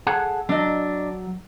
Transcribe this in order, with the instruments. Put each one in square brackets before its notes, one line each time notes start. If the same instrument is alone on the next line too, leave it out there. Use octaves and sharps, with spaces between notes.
[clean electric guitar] G#4 A4 F#5
[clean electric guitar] F#3 [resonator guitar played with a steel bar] D4 D#5